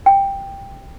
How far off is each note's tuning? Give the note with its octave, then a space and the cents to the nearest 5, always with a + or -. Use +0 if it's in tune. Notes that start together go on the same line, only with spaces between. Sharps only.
G5 +10